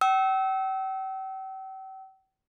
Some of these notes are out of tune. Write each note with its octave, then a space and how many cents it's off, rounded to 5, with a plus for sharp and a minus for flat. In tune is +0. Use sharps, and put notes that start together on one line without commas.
G5 -40 E6 -25